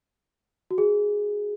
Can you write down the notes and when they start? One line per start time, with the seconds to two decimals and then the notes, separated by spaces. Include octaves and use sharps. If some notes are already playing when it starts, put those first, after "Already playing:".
0.71 F#4
0.78 G#4